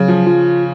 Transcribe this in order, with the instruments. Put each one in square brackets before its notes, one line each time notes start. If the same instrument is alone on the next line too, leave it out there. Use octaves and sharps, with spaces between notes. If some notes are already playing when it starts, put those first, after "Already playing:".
Already playing: [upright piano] C#3 [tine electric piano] F#3
[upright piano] F3
[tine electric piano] F4